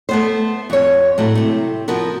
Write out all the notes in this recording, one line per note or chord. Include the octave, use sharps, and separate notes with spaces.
A3 B3 C5
F2 C#5
A2 F#3 A3
C3 A3
F3 B3 F#4 A#4